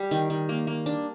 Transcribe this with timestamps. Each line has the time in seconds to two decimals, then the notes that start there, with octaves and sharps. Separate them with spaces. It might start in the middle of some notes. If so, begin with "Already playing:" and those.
Already playing: G3
0.11 D#3
0.30 D#3
0.49 A#3
0.67 A#3
0.86 D4